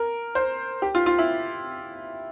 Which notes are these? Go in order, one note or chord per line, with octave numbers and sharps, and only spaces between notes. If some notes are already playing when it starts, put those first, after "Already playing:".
Already playing: A#4
C5
G4
F4
F4
E4